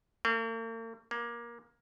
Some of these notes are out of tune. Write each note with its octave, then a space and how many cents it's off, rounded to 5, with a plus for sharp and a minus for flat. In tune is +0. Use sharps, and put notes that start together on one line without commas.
A#3 -45
A#3 +20